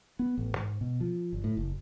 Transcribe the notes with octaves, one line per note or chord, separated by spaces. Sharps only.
B3
A1
G#2
B2
F3
G1
A2
F#1